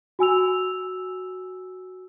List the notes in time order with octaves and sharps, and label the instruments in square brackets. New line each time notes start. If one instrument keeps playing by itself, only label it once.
[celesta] F#4 G#5 E6 F7